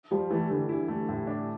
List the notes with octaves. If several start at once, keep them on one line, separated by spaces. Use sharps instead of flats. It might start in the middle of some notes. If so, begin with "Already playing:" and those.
F3 G3
E3 A3
D3 A3
E4
A3
A2
D4